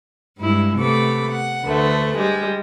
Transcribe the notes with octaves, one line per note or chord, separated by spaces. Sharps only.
G2 G#3 E4
C3 A3 B3 A4 B5 D6
F#5
D2 D3 A3 B4
G3 G#3